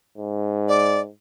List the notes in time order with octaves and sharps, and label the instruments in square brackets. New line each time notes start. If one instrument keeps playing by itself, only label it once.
[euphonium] G#2
[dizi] D5